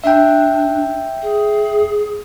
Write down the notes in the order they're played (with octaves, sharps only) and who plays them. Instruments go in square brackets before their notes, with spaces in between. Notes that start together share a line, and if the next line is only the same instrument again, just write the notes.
[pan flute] D4 [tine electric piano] E5 G5
[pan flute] G#4